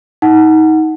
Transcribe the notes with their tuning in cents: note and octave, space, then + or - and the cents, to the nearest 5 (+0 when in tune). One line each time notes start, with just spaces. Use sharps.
D#4 +25 F#5 +0